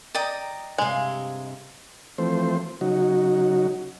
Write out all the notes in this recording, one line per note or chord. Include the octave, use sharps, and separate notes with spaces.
D5 D#5 G5 A#5 D#6
G2 C3 G#3 F5 G#5 E6
E3 F3 A3 C4 C5
C#3 F#3 D#4 F#4